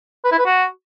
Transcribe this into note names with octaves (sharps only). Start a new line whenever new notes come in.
B4
E4
B4
F#4